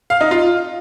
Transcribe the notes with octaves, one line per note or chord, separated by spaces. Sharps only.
F5
D#4
F4